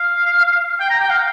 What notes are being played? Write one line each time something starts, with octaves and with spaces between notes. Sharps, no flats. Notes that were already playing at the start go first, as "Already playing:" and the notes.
Already playing: F5
G5
A#5
G5
F5